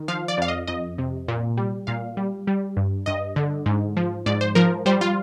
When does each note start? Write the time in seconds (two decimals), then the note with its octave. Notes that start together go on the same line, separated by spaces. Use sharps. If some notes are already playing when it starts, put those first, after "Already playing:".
Already playing: D#3
0.08 F3 F5
0.28 D5
0.38 F2 F5
0.48 D#5
0.67 F2 D#5
0.98 C3
1.28 A#2
1.57 G3
1.87 A#2 F5
2.17 G3
2.47 G3
2.77 G2
3.06 G2 D#5
3.36 D3
3.66 G#2
3.97 F3
4.26 G#2 D5
4.41 C5
4.55 F3 A#4
4.86 G3 C5
5.01 F4